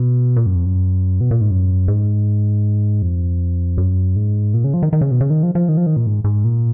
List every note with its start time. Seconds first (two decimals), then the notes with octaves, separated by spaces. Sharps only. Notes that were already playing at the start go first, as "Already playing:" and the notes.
Already playing: B2
0.36 A#2
0.46 F#2
0.55 F2
0.66 F#2
1.21 B2
1.31 A#2
1.41 G#2
1.51 F#2
1.88 G#2
3.02 F2
3.78 F#2
4.16 G#2
4.54 A#2
4.64 C#3
4.74 F3
4.83 D#3
4.93 D#3
5.01 C#3
5.11 B2
5.21 C#3
5.30 D#3
5.43 F3
5.55 F3
5.69 D#3
5.77 F3
5.86 D#3
5.96 A#2
6.07 G#2
6.24 G#2
6.44 A#2